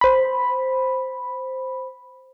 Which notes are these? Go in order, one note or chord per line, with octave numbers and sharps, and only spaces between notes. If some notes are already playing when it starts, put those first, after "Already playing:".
C5 B5